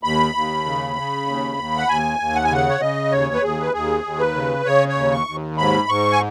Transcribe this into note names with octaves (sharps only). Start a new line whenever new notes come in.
D#2 B5
D#2
C#3
C#3
D#2
D#2
F#5
D#2 G#5
D#2
F#5
G#5
C#3 F#5
C#5
C#3 D#5
D#2 C#5
B4
D#2 G#4
B4
D#2 G#4
D#2
B4
C#3
C#3 C#5
C#5
D#2
C#6
D#2
G#2 B5
G#2 C#6
G#5